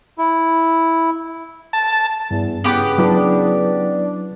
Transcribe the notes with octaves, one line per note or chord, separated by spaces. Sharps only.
E4
A5
E2 G2
C#3 B3 G4 D6 B6
F#3 D4 E4 B4